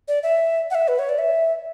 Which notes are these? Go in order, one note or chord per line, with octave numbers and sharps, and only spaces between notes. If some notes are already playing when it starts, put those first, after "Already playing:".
D5
E5
F#5
E5
B4
C#5
D5
E5